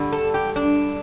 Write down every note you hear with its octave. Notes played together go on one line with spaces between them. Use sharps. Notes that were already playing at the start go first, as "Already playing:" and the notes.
Already playing: G2 D3 G3
A4
G4
D4